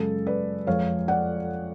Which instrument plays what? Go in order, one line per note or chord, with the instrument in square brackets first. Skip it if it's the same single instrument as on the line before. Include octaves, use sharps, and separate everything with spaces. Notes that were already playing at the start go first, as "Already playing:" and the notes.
Already playing: [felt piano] F#2 C#3 G#3 A4
B4 D5
F2 F3 G#3 C#5 F5
D5 F#5